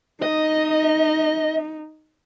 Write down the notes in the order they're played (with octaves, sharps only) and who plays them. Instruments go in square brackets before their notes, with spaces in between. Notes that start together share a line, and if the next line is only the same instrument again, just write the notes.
[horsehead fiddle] D#4 [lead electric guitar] D#5